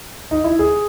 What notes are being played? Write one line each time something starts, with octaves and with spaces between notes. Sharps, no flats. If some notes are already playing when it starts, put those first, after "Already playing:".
D#4
E4
G#4